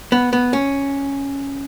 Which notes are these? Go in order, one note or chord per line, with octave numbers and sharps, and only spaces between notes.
B3
B3
C#4